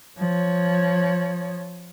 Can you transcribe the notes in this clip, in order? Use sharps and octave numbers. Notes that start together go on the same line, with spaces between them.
F3 C#5